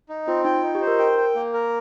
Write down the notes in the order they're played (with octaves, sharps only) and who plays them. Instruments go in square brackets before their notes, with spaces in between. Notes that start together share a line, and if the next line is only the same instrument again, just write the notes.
[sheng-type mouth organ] D#4
[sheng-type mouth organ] C4 [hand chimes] F4
[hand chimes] D#4 [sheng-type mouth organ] G5
[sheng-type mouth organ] D#4 [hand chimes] F4
[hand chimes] G4
[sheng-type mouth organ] C5
[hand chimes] A#4
[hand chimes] A#4 [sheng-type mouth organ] G5
[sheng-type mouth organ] G5
A#3
A#4